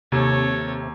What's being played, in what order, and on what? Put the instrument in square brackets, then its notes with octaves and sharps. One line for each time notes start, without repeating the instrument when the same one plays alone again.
[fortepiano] D#2 [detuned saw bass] C3 [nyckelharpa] A4 C#5